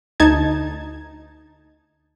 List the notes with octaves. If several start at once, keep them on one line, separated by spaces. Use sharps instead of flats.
D2 D#4 A5 G#6